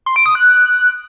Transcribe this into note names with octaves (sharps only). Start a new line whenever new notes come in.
C6
D7
D#6
F#6